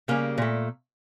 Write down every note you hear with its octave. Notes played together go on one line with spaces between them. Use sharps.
C#3 G3 A#3
A#2 A3